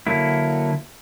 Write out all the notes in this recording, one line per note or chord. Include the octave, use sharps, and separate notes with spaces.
D3 F#3 A#3 E4